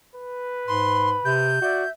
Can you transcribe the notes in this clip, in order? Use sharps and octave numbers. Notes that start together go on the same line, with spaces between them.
B4
G#2 B5 C6
C3 G6
F#4 D5 E5